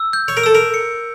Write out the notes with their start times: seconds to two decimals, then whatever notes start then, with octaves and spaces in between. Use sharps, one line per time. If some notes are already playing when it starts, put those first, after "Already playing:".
Already playing: E6
0.13 G6
0.28 C#5
0.37 A#4
0.44 A4 E6
0.55 A#4
0.74 C#7